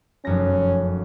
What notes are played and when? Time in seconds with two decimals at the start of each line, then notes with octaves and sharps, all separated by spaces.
0.25 F1 F#2 C#4 A#6